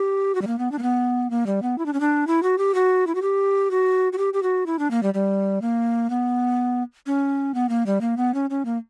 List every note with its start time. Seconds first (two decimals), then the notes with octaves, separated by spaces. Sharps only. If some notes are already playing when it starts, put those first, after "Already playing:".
Already playing: G4
0.35 F#4
0.42 G3
0.47 A#3
0.59 B3
0.72 D4
0.79 A#3
0.82 B3
1.30 A#3
1.46 G3
1.62 B3
1.78 E4
1.86 D4
1.93 C#4
2.00 D4
2.27 E4
2.43 F#4
2.58 G4
2.74 F#4
3.07 E4
3.15 F#4
3.22 G4
3.71 F#4
4.12 F#4
4.18 G4
4.34 G4
4.43 F#4
4.66 E4
4.79 D4
4.91 A#3
5.03 G3
5.14 G3
5.62 A#3
6.10 B3
7.06 C#4
7.54 B3
7.69 A#3
7.86 G3
8.01 A#3
8.17 B3
8.34 C#4
8.50 C#4
8.65 A#3